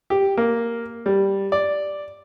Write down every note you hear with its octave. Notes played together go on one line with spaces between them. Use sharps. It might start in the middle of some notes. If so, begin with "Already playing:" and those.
G4
A#3
G3
D5